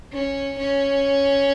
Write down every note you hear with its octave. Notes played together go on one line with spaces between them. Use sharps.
C#4
C#4